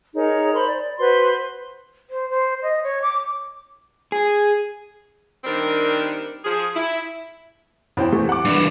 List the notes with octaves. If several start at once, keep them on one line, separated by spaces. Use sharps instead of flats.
D#4 G#4 A#4 C#5
C5 B5 C6
D5
F#4 B4 C5 C6
C5
C5
D#5
C#5
D6
G#4
D#3 G3 C4 D4 A#4
F3 G#4
E4
E2 C5 G5
C3 E3 A3
F#5 D6
G2 E3